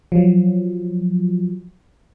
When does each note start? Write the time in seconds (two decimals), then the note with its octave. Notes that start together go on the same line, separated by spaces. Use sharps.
0.12 F3 F#3